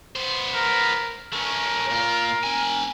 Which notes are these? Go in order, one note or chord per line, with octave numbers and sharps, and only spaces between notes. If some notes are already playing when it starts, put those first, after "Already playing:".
B3 C5
A#4
A3 C#4 A#4
A#2 F4
C4 G#5